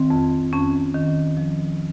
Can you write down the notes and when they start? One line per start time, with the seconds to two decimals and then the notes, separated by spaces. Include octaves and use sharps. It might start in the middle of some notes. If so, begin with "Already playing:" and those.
Already playing: D#3 C4
0.10 F2
0.52 F2 C#4
0.94 D#3
1.37 F3